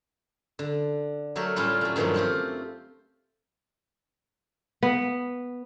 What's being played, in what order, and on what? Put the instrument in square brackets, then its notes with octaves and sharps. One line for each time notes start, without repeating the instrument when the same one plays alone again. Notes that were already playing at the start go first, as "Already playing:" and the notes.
[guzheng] D3
F#3 A3 G4 A4 A#4
A2 G3 C#4 F4 A5
F#3 A3
G2 A#2 D#3 F3 F#3 A3
A3 C4 F4 G4
[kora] B3